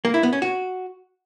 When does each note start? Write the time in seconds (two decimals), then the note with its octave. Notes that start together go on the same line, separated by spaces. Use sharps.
0.05 A#3
0.14 E4
0.23 B3
0.33 C#4
0.42 F#4